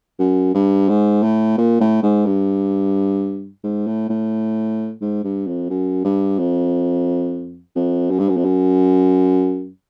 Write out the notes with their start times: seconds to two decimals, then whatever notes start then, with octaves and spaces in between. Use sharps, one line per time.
0.19 F#2
0.54 G2
0.89 G#2
1.23 A2
1.58 A#2
1.80 A2
2.03 G#2
2.26 G2
3.63 G#2
3.87 A2
4.09 A2
5.01 G#2
5.24 G2
5.47 F2
5.70 F#2
6.04 G2
6.39 F2
7.76 F2
8.10 F#2
8.19 G2
8.29 F#2
8.37 F2
8.45 F#2